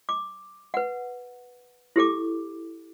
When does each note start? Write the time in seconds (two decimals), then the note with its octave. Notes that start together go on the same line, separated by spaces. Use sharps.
0.09 D6
0.74 B4 F#5
1.96 E4 G4 A4 D6